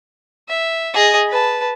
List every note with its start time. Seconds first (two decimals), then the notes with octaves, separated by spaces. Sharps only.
0.49 E5
0.94 G#4 D#5
1.28 B4 A5